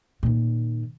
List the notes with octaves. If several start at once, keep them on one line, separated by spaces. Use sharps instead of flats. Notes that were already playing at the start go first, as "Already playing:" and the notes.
A#2 D#3